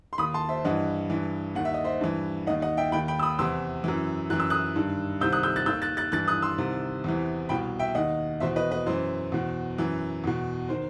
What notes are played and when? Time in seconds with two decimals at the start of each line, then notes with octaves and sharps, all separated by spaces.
0.13 C6
0.18 D#2 D#3 B5 D#6
0.34 A5 C6
0.49 C5 E5
0.65 G2 E3 D#5 F#5
1.10 G2 E3
1.55 D#2 D#3 F#5
1.65 E5
1.74 D#5
1.84 C5 E5
2.01 G2 E3
2.47 D#2 D#3 D#5 F#5
2.62 D#5 F#5
2.77 E5 G5
2.92 D#2 D#3 G5 B5
3.08 G5 B5
3.19 E6
3.23 B5 D#6
3.39 E2 C3 E3 C6 E6
3.84 F#2 E3
4.30 F#2 E3 F#6
4.40 E6
4.50 D#6 F#6
4.76 G2 D#3
5.21 C2 C3 D#3 E6 G6
5.32 D#6 F#6
5.43 E6 G6
5.56 F#6 A6
5.66 D#2 D#3 E6 G6
5.82 F#6 A6
5.97 F#6 A6
6.12 G2 E3 F#6 A6
6.28 D#6 F#6
6.42 C6 E6
6.58 C2 C3 D#3
7.04 E2 C3 E3
7.49 C2 B2 G5 B5
7.79 E5 G5
7.95 D#2 D#3 D#5 F#5
8.40 E2 B2 C5 E5
8.56 B4 D#5
8.71 B4 D#5
8.86 F#2 E3 C5
9.32 E2 B2
9.78 F#2 E3
10.24 E2 B2
10.69 D#3 C5